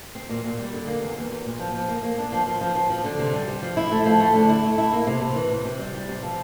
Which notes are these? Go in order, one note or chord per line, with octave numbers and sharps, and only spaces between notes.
C4
A#2
A#2
G3
D3
A#3
E2
E2
E2
A#2
F3
F3
A#3
A#3
D4
F3
F3
F3
F3
F3
D3
C3
G3
G3
F3
E4
A3
F3
A3
D3
E4
A3
E4
A#3
C3
C3
E3
C3
C3
G3
G3
C3
F3